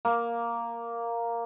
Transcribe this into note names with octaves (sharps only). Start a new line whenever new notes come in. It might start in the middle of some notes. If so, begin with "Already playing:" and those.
A#3